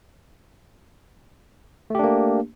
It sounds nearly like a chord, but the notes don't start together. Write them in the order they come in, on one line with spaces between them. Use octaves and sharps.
A3 G4 D4 A#3